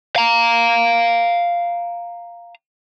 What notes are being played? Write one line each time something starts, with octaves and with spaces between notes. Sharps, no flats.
F5 A#5